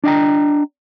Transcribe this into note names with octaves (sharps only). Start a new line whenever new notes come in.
D4 D#5 G5 A#5